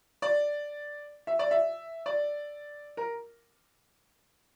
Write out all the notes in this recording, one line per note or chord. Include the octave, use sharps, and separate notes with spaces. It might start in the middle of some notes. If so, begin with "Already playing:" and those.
D5
E5
D5
E5
D5
A#4